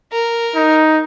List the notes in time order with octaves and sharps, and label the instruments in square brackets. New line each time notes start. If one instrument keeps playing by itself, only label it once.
[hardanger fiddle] A#4
[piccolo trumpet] D#4